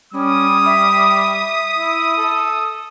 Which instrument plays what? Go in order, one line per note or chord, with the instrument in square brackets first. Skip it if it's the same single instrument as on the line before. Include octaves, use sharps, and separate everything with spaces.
[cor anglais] G3 [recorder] C#4 [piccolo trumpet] D#6
[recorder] E5
[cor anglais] E4
A4